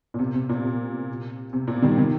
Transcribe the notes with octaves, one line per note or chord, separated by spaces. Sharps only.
A#2
C3
C3
A#2
C3
C3
A#2
D#3 G3
C3 D#3